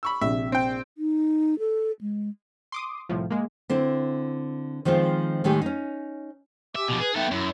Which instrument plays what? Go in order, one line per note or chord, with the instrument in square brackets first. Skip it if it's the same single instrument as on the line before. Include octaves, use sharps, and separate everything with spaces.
[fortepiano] B5 C#6 E6
[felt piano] A#1 C3 [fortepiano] E5
[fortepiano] C4 G5
[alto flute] D#4
A4
G#3
[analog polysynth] C6 D6 D#6
C2 A2 F3
G#3 A#3
[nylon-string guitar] D3 C4 E4
D#3 F3 G#3 C4 F4
A2 D#3 G#3 A3 G4 G#4
C#4 D#4
[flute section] G4 G#5 D6 [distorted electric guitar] E5
[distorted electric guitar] B2 F3
[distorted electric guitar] G#4 [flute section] B4
[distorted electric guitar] B3 A4 [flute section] D#4 E5 G5
[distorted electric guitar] F#2 [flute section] E4